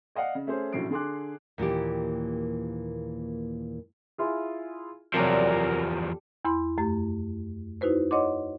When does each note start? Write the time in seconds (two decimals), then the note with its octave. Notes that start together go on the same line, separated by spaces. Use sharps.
0.15 D5 D#5 F5 F#5
0.35 C#3
0.47 A3 C#4 G#4 C5
0.73 A#1 A2 C#3 F#3 C7 D7
0.91 D3 G#4 C6 D6 F#6
1.58 D#2 A#2 E3 G4
4.18 E4 F4 G#4
5.14 E2 C3 F3 F#3 G4 A4 A#4 D5
6.45 E2 E4 B5 C6
6.78 F#2 A3 G4
7.81 D#4 E4 F#4 B4 C5
8.11 C#5 D#5 F#5 C6 D6